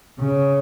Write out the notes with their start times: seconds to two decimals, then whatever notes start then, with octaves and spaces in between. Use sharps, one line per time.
0.20 C#3